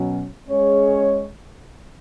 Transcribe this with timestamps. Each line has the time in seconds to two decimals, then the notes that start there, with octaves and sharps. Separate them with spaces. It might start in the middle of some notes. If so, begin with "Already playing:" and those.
Already playing: B2 F#3 C#4
0.48 G#3 C#4 G#4 C#5